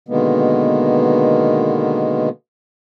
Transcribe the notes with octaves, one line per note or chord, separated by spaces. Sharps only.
B2 D3 D#3 G#3 A#3 B3